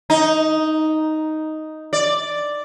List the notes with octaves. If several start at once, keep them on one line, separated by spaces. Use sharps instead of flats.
D#4
D5